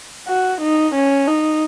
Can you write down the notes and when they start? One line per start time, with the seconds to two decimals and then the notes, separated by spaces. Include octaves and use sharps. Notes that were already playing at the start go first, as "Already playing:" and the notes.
0.28 F#4
0.61 D#4
0.95 C#4
1.27 D#4